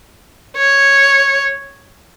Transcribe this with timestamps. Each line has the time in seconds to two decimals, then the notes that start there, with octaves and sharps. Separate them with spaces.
0.57 C#5